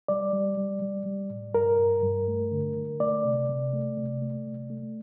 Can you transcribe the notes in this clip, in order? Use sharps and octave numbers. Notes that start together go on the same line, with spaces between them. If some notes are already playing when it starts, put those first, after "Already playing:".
G3 D5
G3
G3
G3
G3
A2
G2 A#4
G2
G2
A3
D3
D3
A3 D5
C3
C3
A3
C3
A3
C3
A3